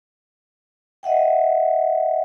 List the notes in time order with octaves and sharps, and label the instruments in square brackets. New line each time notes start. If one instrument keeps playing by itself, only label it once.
[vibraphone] D#5 E5 F#5 G5